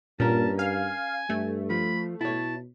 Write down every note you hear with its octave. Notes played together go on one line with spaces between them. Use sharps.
G2 A#2 C#4 A#4 A5
F5 G#5
G2 A3
F3 B5
B2 E4 C#5 A5